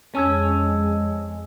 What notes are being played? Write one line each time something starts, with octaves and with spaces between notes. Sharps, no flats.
F2 G#3 C#4 A5 E6 G#6